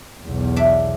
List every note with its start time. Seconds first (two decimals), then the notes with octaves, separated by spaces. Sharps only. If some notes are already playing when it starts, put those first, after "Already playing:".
0.24 B1 E2
0.56 D4 E5